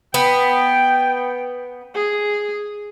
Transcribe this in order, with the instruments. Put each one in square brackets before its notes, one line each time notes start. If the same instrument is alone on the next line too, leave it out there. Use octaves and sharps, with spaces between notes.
[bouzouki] B3 [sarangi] G5
[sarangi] G#4